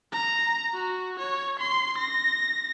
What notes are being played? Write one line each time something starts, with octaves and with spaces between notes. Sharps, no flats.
A#5
F#4
C#5
C6
A#6